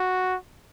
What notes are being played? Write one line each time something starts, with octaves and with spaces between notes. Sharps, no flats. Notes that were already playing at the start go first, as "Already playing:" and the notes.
Already playing: F#4